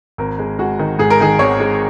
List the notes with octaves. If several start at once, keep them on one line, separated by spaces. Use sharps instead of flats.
G#1 A#4
G#3
G#3 F#4
D#3
G#2 G#4
A#4
D#3 G#4
G#1 C#5
G#3